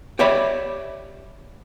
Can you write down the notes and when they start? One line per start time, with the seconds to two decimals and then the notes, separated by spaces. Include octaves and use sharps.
0.19 G4 C#5 D5 E5 B5